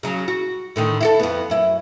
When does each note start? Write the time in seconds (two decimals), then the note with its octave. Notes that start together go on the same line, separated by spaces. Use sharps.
0.03 C#3 F#3
0.28 F#4
0.76 A2 D3 D#3
1.01 E4 F#4 A4
1.19 F2 B3
1.50 F#2 E4